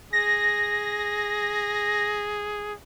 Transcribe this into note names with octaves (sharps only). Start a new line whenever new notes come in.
G#4 A#6